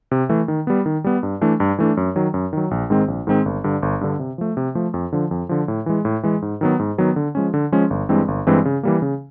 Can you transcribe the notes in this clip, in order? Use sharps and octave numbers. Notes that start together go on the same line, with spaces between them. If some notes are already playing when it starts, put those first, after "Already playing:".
C3
E3 A3
D#3
G3 B3
D#3
G3 B3
G2
E3 A3 D4
G2
E3 A3 D4
F#2
D#3 F#3
F#2
D#3 F#3
A#1
G#2 D#3 G#3 C4
A#1
G#2 D#3 G#3 C4
G1
G2 D3
G1
G2 D3
C3
F3 A3
C3
F3 A3
F2
D3 F3
F2
D3 F3
A2
E3 G#3
A2
E3 G#3
G#2
D#3 F#3 B3
G#2
D#3 F#3 B3
D3
F3 G#3 C#4
D3
F3 G#3 C#4
G1
G2 E3 G#3 C4
G1
G2 E3 G#3 C4
C#3
E3 G3 A#3
C#3